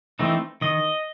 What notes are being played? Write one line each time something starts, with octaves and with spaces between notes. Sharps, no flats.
E3 A3 C4 D#4
D#3 D#5